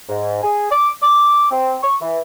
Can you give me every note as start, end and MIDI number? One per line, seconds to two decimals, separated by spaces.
0.09 0.42 44
0.44 0.70 68
0.71 0.91 86
1.03 1.47 86
1.51 1.78 60
1.83 1.97 85
2.02 2.21 52